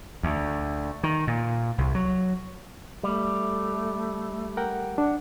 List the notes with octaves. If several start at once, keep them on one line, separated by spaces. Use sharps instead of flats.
D2
D#3
A#2
C2
F#3
G3 A3
A#4 F#5 G5
D4 F#5